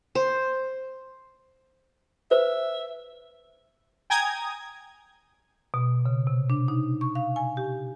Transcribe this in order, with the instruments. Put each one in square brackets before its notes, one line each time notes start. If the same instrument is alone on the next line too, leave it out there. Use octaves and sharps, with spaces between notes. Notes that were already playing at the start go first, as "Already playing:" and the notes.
[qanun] C5
[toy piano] B4 C5 [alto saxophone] E5
[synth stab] G5 G#5 A#5 D#6 G#6
[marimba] B2
C#3
C3
D4
D#4
C#6
F5
G#5
G4